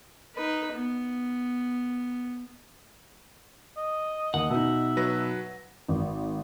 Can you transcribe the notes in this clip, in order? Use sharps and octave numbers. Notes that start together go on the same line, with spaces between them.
D#4 B4
B3
D#5
D#2 F#5
B2 D#4 E5
F#3 B4 A#6
G#1